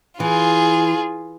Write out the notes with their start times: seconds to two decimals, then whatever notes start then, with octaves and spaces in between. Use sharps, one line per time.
0.20 E3 F4 G#4